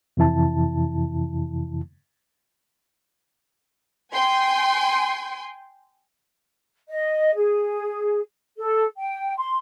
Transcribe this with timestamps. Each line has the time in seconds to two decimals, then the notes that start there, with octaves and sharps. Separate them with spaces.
0.17 F2 C3 E3 E4 A5
4.13 G5 G#5 C6
6.88 D#5
7.35 G#4
8.57 A4
8.97 G5
9.37 C6